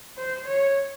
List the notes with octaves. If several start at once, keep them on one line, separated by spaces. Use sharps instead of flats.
C5
C#5